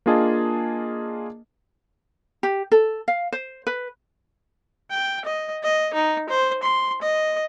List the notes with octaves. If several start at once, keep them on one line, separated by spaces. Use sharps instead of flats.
A#3 D4 F4 G#4 D#5 A5
G4
A4
F5
C5
B4
G5
D#5
D#5
D#4
C5
C6
D#5